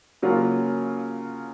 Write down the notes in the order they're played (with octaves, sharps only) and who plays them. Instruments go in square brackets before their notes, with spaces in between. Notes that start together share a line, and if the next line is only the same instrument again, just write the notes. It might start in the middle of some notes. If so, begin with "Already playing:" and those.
[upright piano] C#3 F#3 A#3 F4